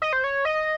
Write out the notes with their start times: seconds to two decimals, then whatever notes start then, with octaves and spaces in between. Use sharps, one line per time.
0.02 D#5
0.13 C5
0.24 C#5
0.45 D#5